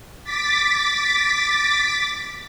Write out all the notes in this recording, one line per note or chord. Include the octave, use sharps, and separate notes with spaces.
D6 A6 B6